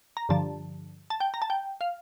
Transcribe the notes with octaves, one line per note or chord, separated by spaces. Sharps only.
A#5
G2 D3 F3 A5
A5
G5
A#5
A5
G5
F5